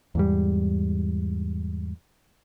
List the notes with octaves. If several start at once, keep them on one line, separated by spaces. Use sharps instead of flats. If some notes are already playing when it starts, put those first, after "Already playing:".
E2 G#2 G3